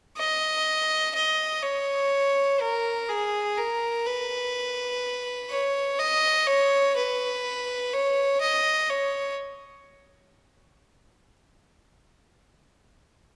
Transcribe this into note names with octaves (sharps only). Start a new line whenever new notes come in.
D#5
D#5
C#5
A#4
G#4
A#4
B4
C#5
D#5
C#5
B4
C#5
D#5
C#5